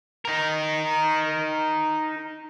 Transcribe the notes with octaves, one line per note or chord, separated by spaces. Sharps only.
D#4 A#4